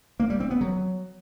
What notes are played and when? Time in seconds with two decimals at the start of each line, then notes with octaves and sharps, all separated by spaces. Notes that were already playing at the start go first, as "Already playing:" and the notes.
0.20 A#3
0.30 G3
0.40 C4
0.51 B3
0.61 F#3